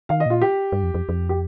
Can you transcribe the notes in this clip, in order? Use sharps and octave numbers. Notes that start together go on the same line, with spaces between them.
D#3 F5
D#5
A#2 F4
G4
G2
F2
F2
F2
G4